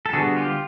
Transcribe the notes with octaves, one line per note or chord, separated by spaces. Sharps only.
A4
D3 G3 B3 F#4 G#4
F4 G4